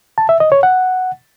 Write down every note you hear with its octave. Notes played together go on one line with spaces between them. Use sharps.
A5
E5
D#5
C#5
F#5